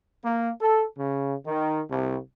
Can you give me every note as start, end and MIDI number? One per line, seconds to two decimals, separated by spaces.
0.25 0.49 58
0.62 0.84 69
0.97 1.34 49
1.47 1.81 51
1.90 2.17 36